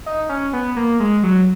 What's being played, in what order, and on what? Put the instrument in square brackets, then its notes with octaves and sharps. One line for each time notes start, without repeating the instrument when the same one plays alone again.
[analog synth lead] D#4
C#4
B3
A#3
G#3
F#3